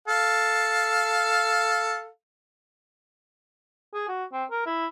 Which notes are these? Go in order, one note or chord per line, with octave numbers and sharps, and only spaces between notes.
A4 F5
G#4
F#4
C4
A#4
E4